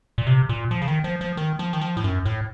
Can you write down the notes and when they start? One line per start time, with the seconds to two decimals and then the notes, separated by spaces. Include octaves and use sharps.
0.18 A#2
0.27 C3
0.49 A#2
0.71 F3
0.82 C#3
0.88 D#3
1.04 F3
1.21 F3
1.37 D#3
1.59 F3
1.73 D#3
1.81 F3
1.97 A2
2.04 F#2
2.26 A2